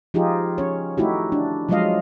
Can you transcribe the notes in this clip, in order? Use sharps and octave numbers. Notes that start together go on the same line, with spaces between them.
F3 D#4 F4 G4 G#4
C#4 C#5
A3 D#4 E4 F#4 G4
D4
F3 F#3 G#3 F4 D#5 F5